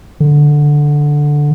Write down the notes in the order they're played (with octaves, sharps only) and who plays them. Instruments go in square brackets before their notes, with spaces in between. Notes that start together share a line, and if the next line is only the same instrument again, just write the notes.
[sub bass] D3